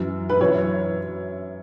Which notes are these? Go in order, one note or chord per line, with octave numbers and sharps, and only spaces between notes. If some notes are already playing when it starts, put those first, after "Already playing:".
Already playing: F#2 E3
B4
F#2 E3 C#5